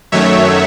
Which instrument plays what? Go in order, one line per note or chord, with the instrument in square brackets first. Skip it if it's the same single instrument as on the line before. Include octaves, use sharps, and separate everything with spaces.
[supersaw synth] F#2 D#3 F#3 A3 C#5 E5